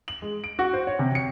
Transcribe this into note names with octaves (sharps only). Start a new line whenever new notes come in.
F#7
G#3
D7
F#4
C5
C#5
C3
C#7